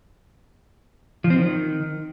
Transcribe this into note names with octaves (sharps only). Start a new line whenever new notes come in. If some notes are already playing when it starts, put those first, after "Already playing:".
F3
C4
D#3